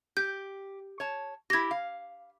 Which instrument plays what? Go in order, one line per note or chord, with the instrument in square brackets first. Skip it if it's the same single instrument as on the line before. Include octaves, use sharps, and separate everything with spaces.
[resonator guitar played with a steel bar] G4 [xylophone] G6
[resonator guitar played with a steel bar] C#5 A5
[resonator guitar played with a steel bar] E4 G4 [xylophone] G#6 A#6
[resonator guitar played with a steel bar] F5